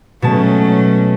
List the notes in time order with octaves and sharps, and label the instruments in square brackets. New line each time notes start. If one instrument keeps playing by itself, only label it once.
[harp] B2 G#3 A5 [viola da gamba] F#3 A3 C#4